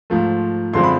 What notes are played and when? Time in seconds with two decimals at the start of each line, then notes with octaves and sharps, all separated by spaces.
0.10 G#2 F3 A3
0.73 F#2 D3 F3 G#3 C4 C6
0.84 B5